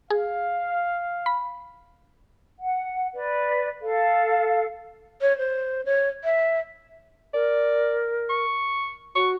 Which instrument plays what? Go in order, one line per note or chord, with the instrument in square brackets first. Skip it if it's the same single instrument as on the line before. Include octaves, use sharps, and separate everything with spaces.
[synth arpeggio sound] G#4 [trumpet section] F5
[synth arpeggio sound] B5
[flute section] F#5
B4 D5
A4 F5
[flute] C#5
C5
C#5
E5
[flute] A#4 [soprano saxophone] D5
[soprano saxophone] C#6
[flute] F#4 [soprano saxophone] C#6